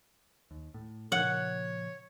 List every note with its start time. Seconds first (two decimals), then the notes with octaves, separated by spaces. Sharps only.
0.51 D#2
0.74 A2
1.12 A#2 C#3 F3 C#5 F#5